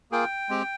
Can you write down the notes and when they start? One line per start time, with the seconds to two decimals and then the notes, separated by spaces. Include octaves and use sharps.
0.11 A#3 F4 G#4 G5
0.49 G#3 C4 G4